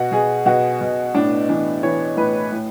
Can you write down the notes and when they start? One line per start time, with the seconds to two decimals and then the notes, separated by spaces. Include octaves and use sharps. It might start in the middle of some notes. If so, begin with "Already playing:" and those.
Already playing: B2 F#4
0.12 B2 G#4
0.46 B2 F#4
0.81 B2
1.14 A2 D4
1.49 E3 D4
1.83 E3 C#5
2.17 A2 B4
2.52 A2